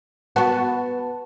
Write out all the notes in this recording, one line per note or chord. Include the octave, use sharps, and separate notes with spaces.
B3 F#4 B4 A5